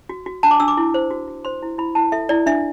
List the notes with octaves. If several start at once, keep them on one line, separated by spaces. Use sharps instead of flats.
F#4
F#4
D4 A5
D6
D4 E6
D6
E4
C5
F#4
F#4
C5 C6
E4
E4 B5
E4 A5
A4 E5
E4 D5
D4 E5